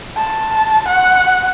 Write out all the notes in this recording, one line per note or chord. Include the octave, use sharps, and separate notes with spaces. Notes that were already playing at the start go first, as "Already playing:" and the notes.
A5
F#5